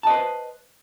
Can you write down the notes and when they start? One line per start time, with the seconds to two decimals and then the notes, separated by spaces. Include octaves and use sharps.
0.03 A5
0.07 D#5
0.10 C5
0.14 B4